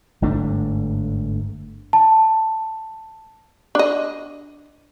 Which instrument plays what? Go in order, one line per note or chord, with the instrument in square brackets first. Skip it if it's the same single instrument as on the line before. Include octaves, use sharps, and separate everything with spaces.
[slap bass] G1 G#2 A3 D4
[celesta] A5
[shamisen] D4 D#5